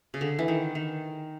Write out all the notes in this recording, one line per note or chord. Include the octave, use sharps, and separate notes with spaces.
C#3
D3
E3
D#3
D#3